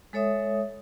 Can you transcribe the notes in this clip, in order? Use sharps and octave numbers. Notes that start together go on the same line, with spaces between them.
G#3 A4 C#5 E5 D#6